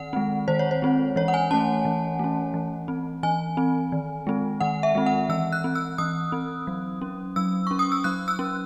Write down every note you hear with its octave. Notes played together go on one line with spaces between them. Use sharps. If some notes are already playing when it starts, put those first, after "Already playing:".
Already playing: D#3 F#5
G#3 C4
D#3 C5
C#5
C5
G#3 C4
E3 C#5
F#5
G#5
A3 C#4 A5
E3
A3 C#4
E3
C4
E3 G#5
C4
D#3
G#3 C4
D#3 F#5
E5
G#3 C4
F#5
E3 E6
F#6
C4
E6
E3 D#6
C4
F#3
C#4
F#3 E6
C#4 C#6
D#6
E6
F#3 F#6
E6
C#4